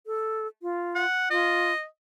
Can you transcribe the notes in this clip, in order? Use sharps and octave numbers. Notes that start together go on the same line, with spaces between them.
A4
F4
F#5
F4 D#5